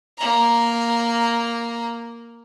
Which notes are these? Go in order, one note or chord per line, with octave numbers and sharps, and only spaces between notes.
A#3 A#5